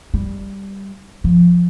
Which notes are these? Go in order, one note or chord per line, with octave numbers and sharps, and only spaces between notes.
G3
F3